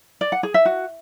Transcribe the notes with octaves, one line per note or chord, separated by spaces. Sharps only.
D5
F#5
G#4
E5
F#4